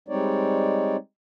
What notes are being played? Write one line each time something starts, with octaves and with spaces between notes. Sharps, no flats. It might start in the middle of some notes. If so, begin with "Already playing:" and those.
G3 G#3 C4 D#4 C#5 D5